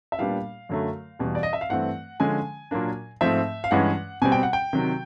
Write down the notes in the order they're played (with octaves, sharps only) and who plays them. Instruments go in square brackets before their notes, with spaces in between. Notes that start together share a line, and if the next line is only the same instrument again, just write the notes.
[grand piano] E5
A#2 G3 B3 D4 F5
F#2 D3 F#3 A3
E2 B2 G3
D5
D#5
E5
F5
G2 E3 A3 C4 F#5
D3 F3 G#3 C#4 G#5
A#2 F#3 A#3 D4
G#2 F3 A3 C4 E5
F5
G2 E3 G#3 C#4 F#5
B2 G3 C4 G#5
G5
F#5
G5
C3 D#3 F#3